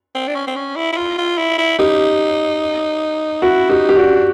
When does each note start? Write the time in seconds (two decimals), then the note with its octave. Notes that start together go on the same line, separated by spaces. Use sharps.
0.15 C4
0.28 D4
0.35 C#4
0.47 C4
0.56 C#4
0.76 E4
0.93 E4
0.97 F4
1.18 F4
1.38 E4
1.58 E4
1.79 D#4 G4
3.42 E4 F#4
3.70 D#4 G4
3.89 G4
3.96 D4 F#4